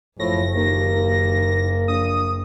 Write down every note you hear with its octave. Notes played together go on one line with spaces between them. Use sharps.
F#1 A2 F3 A#6
D#2 A#3
D#2
A#1 D#6